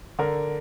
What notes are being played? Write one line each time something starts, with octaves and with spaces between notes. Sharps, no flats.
D3 A#4